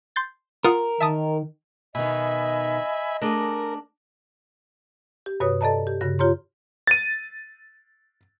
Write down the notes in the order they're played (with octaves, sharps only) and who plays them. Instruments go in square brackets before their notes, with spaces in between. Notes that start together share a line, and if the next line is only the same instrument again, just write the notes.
[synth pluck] C6 G6 A6
[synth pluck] F4 F#5 D#6 [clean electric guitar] A#4
[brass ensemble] D#3 [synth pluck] E5 A5 D#6
[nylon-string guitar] B2 D#3 [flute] D#5 [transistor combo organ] E5 G#5 B5
[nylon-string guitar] A3 G#4 G#5 [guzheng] D4 D#5 [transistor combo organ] A#4
[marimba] G4
G2 C3 F#4 B4 C#5 D#6
A4 D5 D#5 A5 A#5
G4
G2 C#3 F#4 A#6
F4 G4 C#5 A#5 C6
[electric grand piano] A6 D#7